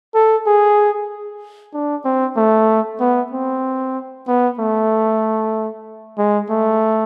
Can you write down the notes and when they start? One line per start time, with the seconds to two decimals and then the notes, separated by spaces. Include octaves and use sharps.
0.15 A4
0.47 G#4
1.74 D4
2.05 C4
2.37 A3
3.00 B3
3.32 C4
4.28 B3
4.59 A3
6.18 G#3
6.50 A3